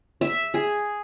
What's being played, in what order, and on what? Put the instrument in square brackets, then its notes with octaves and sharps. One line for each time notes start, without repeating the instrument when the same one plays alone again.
[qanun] E5
G#4